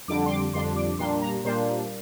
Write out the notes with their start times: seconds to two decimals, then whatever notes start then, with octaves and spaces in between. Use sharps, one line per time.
0.08 F2 D3 G3 D4 D6
0.26 C6
0.31 D6
0.53 F2 D3 G3 D4 C6
0.76 D6
0.99 A#2 G3 A#3 D4 C6
1.22 A#5
1.45 A#2 G3 A#3 D4 C5